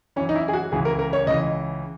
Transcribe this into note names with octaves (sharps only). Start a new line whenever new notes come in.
F#2 E3 C#4
D#4
E4
G#4
F#4
C#2 C#3 E3 G#4
A#4
A#4
C#5
C#2 C#3 E3 D#5